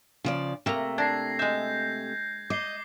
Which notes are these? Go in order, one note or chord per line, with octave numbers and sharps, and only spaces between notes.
C#3 F3 D5
C3 A3 A#3 A#5
D4 G#6 A#6 C7
G#3 E5 G6
D#5 D6 C7 G7